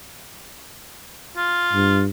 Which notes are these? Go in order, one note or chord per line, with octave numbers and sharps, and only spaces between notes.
F4
G2